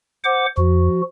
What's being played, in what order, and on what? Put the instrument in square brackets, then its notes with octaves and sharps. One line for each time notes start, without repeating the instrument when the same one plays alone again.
[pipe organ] C5 F#5 D6
[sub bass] F2 [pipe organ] F3 F#4